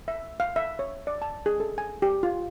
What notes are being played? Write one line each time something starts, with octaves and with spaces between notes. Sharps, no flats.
E5
F5
E5
C#5
D5
A5
G#4
A4
G#5
G4
F4